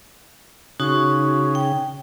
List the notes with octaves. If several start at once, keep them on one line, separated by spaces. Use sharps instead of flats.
C#3 D#4 F#4 C#6
G5